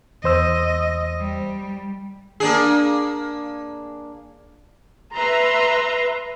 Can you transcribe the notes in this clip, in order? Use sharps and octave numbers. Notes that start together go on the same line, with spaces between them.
E2 C5 D#5 E6
G3
A#3 D4 G#4
B4 E5 A#5 C6